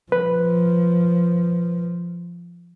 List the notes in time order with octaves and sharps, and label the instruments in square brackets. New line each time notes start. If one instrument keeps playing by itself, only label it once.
[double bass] F3 [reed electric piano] B4